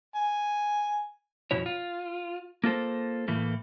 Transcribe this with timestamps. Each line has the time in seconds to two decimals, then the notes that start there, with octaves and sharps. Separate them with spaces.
0.15 G#5
1.51 F2 B2 E4 C#5
1.66 F4
2.64 A#3 F4 A4 C5
3.28 A2 E3 A3 A#3